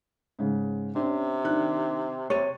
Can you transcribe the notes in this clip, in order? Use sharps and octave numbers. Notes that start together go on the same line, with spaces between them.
G#2 C#3
C3 C#4 D4
D#3 D4 F#6
C3 C#5 A6 D#7